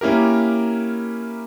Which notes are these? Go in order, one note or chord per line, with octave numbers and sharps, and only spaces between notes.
A#3 C#4 E4 G4 A#4